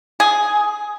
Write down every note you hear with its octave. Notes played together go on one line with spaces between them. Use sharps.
G#4